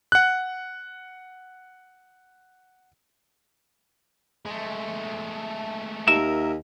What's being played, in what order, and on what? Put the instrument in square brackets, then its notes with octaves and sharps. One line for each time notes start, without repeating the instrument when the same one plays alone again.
[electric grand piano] F#5 F#6
[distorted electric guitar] G#3 A3
[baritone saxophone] D#2 [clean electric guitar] A#4 E5 [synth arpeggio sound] E7